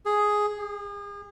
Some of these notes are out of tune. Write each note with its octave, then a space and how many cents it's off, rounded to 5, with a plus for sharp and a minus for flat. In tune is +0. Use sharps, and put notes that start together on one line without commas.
G#4 +5
G#4 -40